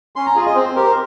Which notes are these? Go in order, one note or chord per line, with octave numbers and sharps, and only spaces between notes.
C#4 C6
A#5
F4 G#4
D#5
C4 C5
G4 A#4
C5